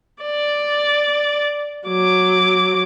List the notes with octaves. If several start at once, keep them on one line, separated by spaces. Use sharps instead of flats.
D5
F#3 D6